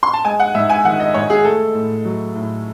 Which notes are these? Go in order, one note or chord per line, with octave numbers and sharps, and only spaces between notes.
C6
A5
G#3 G#5
F#5
G#2 E5
G#5
D#3 F#5
D#5
G#2 C#5
G#4
A3 A4
A2
F#3
A2